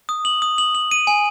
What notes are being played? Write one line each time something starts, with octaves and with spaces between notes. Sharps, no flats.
D#6
F#7
D#6
F#7
F#7
D#7
G#5